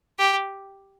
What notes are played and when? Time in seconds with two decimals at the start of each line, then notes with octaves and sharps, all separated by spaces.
0.18 G4